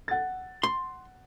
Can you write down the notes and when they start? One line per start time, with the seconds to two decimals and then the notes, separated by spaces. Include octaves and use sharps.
0.08 F#5 A6
0.63 C6